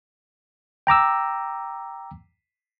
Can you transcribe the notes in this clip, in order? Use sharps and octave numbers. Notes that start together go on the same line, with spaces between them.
G5 A#5 D6 E6